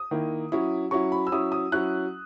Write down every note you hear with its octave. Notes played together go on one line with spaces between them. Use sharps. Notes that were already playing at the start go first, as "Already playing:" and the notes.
Already playing: D#6
D#3 A#3 E4
F#3 C#4 E4
F#3 C#4 E4 C#6
B5
E6
F#3 C#4 E4 D#6
D#6
F#3 C#4 E4 F#6